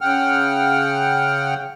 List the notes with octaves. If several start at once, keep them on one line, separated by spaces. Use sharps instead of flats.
C#3 F#5 G5 F6